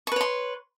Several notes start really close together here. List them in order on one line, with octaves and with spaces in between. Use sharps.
C#6 B4 C#5 C6